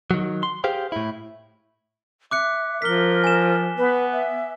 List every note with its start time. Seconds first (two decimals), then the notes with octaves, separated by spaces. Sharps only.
0.11 D#3 F#3
0.43 C6
0.64 G4 G#4 C5 F5 G5
0.92 A2 E4
2.31 E5 D6 F#6 C#7
2.82 F3 A#4 B6 G7
3.24 G#5 E7
3.78 B3 B4
4.13 E5